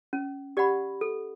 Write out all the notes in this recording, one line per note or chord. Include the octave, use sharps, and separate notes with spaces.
C#4
G4 D5 F#5 B5
A4